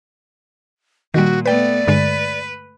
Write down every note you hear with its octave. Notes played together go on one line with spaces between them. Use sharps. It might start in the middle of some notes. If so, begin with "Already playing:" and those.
A#2 D#3 G3 F#4
A3 B3 B4 D5 G5
G2 D3 G#3 B4